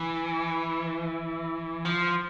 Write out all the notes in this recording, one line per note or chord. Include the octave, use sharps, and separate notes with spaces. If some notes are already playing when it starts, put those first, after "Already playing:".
Already playing: E3
F3